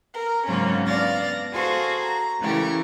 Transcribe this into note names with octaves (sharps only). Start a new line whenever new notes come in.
A#4
G#2 C#3 F#3 A#3 C4 C#4
B3 D4 D5 F5 A6 A#6
F#4 G#4 A4 C5 F5
A#5
C#3 E3 A3 E4 G4 A#4